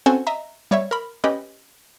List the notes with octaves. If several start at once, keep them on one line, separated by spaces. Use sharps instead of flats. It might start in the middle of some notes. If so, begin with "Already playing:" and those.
C4 C#4 F#4 A4 C5 G#5
D#5 E5 A#5
G3 C#5 D5 E5
A#4 B5
C#4 G4 B4 D#5 B5